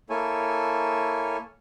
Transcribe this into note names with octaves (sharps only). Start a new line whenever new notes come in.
A#3 E4 A4 C#5 G#5